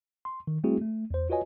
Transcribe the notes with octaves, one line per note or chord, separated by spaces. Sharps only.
C6
D#3
G3 A3 C4 E4 F#4 G#4
A3
E2 C5
F4 F#4 B4 C#5 D#5 G#5